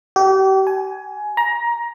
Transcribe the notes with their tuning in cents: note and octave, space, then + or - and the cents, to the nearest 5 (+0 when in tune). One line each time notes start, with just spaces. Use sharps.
G4 -35
G#5 +15
A#5 +20